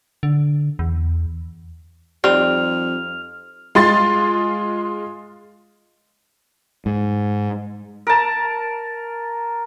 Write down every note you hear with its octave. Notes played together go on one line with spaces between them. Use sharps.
D3
E2
F2 G3 C4 D#4 F6 F7
G#3 F4 C6 A6
G#2
A#4 A5